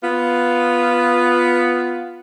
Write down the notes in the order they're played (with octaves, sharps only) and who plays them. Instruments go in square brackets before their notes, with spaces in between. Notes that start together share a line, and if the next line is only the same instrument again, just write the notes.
[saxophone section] B3 F4